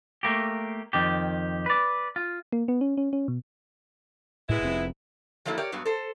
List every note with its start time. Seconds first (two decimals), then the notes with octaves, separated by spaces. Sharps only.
0.23 A3 A#3 G4
0.93 F2 D#3 G4
1.66 B4 D5
2.16 F4
2.53 A#3
2.68 B3
2.81 C#4
2.98 C#4
3.13 C#4
3.28 B2
4.49 A2 G#3 B3 E4
4.62 F1 F2 C4
5.45 F3 F#3 A3 A#3 E4
5.58 G4 A#4 C#5 D5
5.72 G2 F#3 B3
5.86 A4 C5